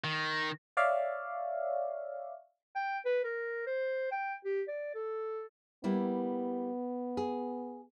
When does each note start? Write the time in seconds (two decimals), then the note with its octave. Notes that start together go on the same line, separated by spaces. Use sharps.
0.04 D#3
0.77 C#5 D5 E5 F5
2.76 G5
3.05 B4
3.24 A#4
3.67 C5
4.12 G5
4.45 G4
4.68 D5
4.95 A4
5.84 G3 A#3 B3 E4
7.17 G#4